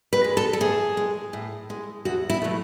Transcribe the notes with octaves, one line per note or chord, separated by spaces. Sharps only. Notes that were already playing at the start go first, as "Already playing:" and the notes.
B4
G#3
A4
A4
A2 G#4
G#3
A2
G#3
E2 F#4
E4
B2 F#3 A3